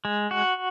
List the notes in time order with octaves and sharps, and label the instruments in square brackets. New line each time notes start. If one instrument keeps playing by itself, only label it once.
[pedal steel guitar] G#3
F#4